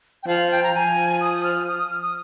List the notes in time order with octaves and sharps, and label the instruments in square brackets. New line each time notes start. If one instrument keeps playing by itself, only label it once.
[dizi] G5
[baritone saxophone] F3 [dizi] F5
[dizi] G5
A#5
[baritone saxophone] F3 [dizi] G#5
[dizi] D#6
F6
D#6
D#6
F6
D#6